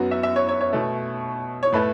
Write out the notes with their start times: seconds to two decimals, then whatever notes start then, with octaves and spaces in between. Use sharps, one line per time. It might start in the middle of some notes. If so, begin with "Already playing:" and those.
Already playing: F#2 F#3 B3 F#4
0.11 E5
0.23 E5
0.36 C#5
0.49 C#5
0.61 C#5
0.73 B2 A3
1.63 C#5
1.73 A2 A3 B4